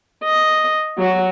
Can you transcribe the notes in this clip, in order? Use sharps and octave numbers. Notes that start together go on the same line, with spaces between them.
D#5
F#3 F#4